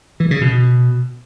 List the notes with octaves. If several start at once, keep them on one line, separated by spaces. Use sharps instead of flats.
E3
C#3
B2